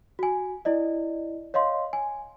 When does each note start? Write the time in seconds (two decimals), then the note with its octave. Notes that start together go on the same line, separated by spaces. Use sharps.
0.19 F#4 G#5
0.65 E4 D5 D#5
1.54 C#5 D#5 F5 C6
1.93 G#5